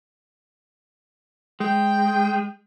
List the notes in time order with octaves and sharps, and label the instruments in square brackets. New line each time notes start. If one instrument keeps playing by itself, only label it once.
[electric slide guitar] G#3 [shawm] G5